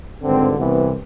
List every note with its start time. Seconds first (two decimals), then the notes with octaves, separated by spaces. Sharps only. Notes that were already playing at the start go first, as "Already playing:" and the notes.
0.23 G#1 G2 D3 C4
0.58 C2 C3 E3 B3